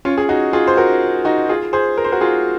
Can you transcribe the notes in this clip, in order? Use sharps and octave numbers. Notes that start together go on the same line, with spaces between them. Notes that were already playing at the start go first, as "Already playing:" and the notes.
C#4 F4
G#4
D#4 F#4
F4 G#4
C5
F#4 A#4
D#4 F#4
F4 G#4
G#4 C5
A#4
C5
F#4 A#4
F4 G#4